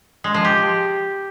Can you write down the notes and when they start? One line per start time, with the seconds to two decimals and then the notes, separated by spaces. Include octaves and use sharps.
0.24 G#3
0.34 F3
0.45 G4